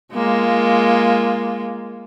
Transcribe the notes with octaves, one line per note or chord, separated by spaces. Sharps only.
G#3 A#3 F4